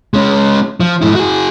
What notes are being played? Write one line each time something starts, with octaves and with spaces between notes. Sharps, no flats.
G#3 C#4
F3
G#2 E4
F#4 G#4